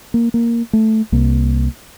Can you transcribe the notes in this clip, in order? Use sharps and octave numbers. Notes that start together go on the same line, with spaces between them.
A#3
A#3
A3
C2 C3 A#3